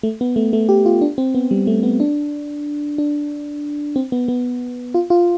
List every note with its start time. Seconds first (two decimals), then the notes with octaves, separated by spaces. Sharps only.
0.03 A3
0.21 B3
0.36 A3
0.53 A3
0.69 G4
0.86 F4
1.01 D4
1.18 C4
1.35 B3
1.51 G3
1.67 A3
1.83 B3
2.00 D4
2.98 D4
3.96 C4
4.12 B3
4.28 B3
4.94 F4
5.10 F4